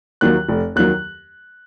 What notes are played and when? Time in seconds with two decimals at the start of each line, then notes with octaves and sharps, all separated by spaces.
0.21 D#2 D#3 F#3 F#6
0.49 F1
0.76 D#2 D#3 F#3 F#6